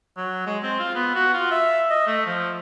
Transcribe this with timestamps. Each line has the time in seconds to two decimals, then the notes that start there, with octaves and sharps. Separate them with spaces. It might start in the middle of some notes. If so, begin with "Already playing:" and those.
0.17 F#3
0.46 G#3
0.63 C4
0.79 F4
0.95 B3
1.14 F#4
1.33 F4
1.51 E5
1.90 D#5
2.07 A3
2.26 F3